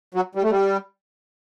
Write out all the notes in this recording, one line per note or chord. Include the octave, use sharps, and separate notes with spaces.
F#3
G3
A3
G3